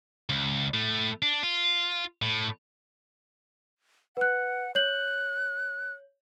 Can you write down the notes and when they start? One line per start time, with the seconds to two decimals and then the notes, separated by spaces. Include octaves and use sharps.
0.29 C#2
0.74 A2 A3
1.22 D4
1.43 F4
2.22 A2
4.17 B4 F#5 F#6
4.75 C#5 F#6 G6 F#7